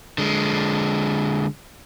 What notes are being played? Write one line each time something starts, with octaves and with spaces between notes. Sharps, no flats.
D3 G#3